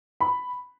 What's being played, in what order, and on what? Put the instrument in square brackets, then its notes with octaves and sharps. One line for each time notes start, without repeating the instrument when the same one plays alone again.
[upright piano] B5